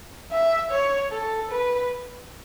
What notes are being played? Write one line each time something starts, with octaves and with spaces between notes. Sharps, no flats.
E5
C#5
A4
B4